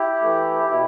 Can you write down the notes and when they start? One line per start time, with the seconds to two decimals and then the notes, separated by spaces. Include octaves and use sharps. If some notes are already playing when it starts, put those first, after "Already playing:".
Already playing: E4 G4
0.21 E3 A3
0.70 B2 E4